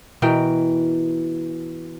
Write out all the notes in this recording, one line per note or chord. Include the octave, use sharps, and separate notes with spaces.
B2 E3 A#4 G5